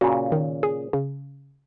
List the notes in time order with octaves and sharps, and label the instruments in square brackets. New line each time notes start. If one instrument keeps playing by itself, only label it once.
[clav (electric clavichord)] A#2 C#3 [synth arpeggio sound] F#4
[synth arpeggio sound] D#3
G#4
C#3